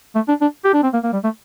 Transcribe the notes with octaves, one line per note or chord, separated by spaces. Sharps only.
A3
D4
D4
G4
D4
C4
A#3
A#3
G3
A3